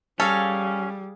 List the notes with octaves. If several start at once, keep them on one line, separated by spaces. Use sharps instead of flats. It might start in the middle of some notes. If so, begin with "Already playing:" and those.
G3 C#4 G#4 A4 F5